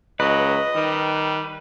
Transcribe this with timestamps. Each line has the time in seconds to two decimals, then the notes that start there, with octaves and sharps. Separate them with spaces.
0.20 C#2 F#3 B4 D#5
0.76 D#3 G3